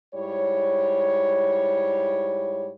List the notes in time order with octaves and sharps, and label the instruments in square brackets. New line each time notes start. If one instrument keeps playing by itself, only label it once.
[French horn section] G#2 G3 E4 C#5